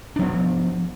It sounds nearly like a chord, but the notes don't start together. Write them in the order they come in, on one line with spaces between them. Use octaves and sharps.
D4 F3 B3